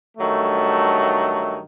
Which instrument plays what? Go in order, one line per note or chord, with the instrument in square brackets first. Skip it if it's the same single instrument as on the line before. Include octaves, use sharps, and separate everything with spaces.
[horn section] G2 D#3 F#3 A3